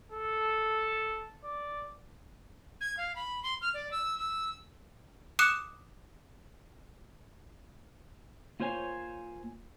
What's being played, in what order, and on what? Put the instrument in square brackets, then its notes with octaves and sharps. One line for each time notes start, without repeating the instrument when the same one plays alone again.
[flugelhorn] A4
D5
[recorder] G#6
F5
B5
C6
F6
D5
E6
E6
[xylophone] D6 D#6 F#6 C#7 E7
[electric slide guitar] A#3 F4 C5 C#5 G#5